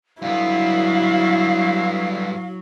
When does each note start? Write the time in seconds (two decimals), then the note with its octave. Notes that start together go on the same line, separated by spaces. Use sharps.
0.22 G2 F#3 B3 E4 F5